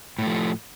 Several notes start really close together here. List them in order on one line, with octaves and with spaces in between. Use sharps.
A2 A3 F3